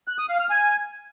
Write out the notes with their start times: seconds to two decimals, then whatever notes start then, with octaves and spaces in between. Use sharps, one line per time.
0.08 F#6
0.18 D#6
0.29 F5
0.40 F6
0.50 G#5